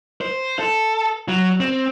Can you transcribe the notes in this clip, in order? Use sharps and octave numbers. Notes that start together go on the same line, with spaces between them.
C5
A4
F#3
C4